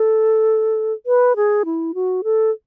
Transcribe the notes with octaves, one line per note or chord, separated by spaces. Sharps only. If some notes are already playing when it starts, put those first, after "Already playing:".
Already playing: A4
B4
G#4
E4
F#4
A4